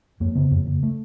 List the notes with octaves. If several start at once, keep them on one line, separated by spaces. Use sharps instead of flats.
F2 A#3
C#3 B3
F2 A#3
C#3
A3